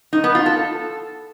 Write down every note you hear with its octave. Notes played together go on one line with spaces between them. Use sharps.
D#4
B3
F4
A4